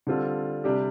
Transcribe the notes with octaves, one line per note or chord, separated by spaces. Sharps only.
D3 G3 C4 F4 A4
C3 G3 D4 G4